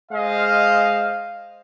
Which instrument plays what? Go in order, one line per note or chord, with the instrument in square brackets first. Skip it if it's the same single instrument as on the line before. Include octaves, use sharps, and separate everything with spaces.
[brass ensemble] G#3 C5 D#5 F5